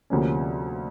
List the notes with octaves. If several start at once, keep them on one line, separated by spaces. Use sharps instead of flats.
D2 C3 F3 A#3 C#4